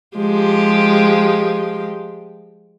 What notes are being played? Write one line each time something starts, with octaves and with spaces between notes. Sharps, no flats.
F3 G#3 G4